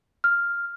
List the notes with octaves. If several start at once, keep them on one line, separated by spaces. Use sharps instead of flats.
F6